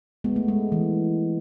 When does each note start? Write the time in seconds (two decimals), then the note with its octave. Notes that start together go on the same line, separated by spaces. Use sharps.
0.24 G#3 B3
0.36 A3
0.48 G#3
0.72 E3